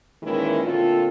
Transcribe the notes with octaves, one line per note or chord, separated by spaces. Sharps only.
A#2 D#3 E3 G#3 C#4 E4
A#2 D3 A3 C4 F4 A4